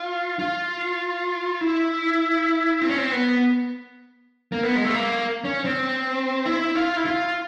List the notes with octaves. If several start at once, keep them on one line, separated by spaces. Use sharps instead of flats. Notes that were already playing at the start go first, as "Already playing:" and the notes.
Already playing: F4
F4
E4
C4
C#4
C4
B3
A#3
B3
G#3
A3
A#3
C#4
C4
E4
F4
E4
F4